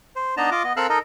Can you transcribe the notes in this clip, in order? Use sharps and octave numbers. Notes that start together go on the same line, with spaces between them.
C5
B3 D4 D#4 D#5 A5 A#5
F4 D#5 D6
B3 D#5
C4 A4 A#4 F5 E6 F#6
D#4 A4 A#4 D#5